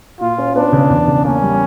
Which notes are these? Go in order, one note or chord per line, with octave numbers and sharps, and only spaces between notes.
A#2 F4
C#4
B3 D4
C#3
E2
C#3
A#3 C#4
G3